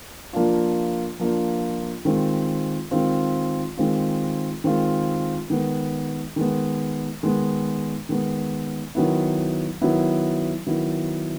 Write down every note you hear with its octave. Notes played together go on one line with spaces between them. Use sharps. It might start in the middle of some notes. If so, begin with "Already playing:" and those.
F3 A#3 D4 F4
F3 A#3 D4 F4
D#3 G#3 C4 F4
D#3 G#3 C4 F4
D#3 G#3 C4 F4
D#3 G#3 C4 F4
D#3 G#3 B3
D#3 G#3 B3
D#3 G#3 B3
D#3 G#3 B3
D#3 F#3 B3 E4
D#3 F#3 B3 E4
D#3 F#3 B3 E4